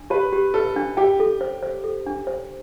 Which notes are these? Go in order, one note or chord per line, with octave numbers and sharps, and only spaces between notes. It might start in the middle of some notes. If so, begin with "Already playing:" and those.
Already playing: D4
G4 B4
G4
A4 B4
D4
G4 G5
A4
C5
C5
A4
D4
C5